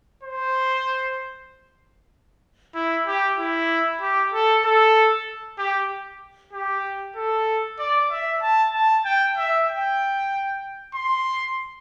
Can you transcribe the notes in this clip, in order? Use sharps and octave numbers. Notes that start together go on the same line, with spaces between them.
C5
E4
G4
E4
G4
A4
A4
G4
G4
A4
D5
E5
A5
A5
G5
E5
G5
C6